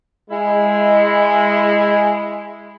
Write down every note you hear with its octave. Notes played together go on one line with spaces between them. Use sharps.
G#3 E4